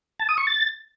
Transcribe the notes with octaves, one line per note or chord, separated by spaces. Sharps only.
A5
D#6
C#6
A6